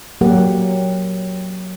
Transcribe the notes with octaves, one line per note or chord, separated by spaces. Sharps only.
F#3 A#3 G4 A#4 F#5